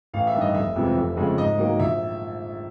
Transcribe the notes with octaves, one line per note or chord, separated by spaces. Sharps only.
A1 F5
E5
G2 D#3
D#5
F1 E5
F2 C3 E3 G#3
F1
F2 C#3 F3 G#3
G#2 D#5
D#3 F#3 A#3
A#1 E5